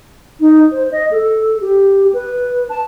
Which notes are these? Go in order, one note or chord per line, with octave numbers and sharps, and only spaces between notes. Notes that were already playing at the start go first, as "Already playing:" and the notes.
D#4
C5
D#5
A4
G4
B4
A5